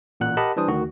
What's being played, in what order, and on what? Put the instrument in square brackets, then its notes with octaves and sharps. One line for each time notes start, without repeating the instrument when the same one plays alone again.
[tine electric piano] A1 A#2 F#5 F#6
G4 A#4 D#5 F#5 A5 B5
E3 G3 D4 C5 D#6
D2 D#3 F#4